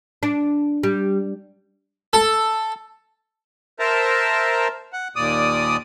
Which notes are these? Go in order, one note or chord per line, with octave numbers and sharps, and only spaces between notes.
D4
G3
A4
A#4 C5 E5 A5 A#5
F#5
D#2 A#2 D5 D#6